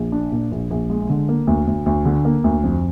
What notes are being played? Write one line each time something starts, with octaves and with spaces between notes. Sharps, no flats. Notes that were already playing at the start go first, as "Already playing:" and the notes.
Already playing: A#1
D4
A#2
A#1
A#1
G#3
D3
A#3
D2
D2
D2
D3
A#3
D2
F2